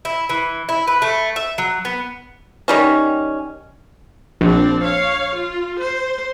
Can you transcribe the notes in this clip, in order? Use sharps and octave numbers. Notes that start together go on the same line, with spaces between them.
E4
E3
E4
B4
A3
E5
F#3
B3
D#3 G3 C#4
A#1 C4 D4
C#5 F5
F4
C5